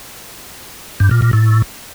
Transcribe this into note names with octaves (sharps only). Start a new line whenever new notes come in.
G2
A#2
A#2
A2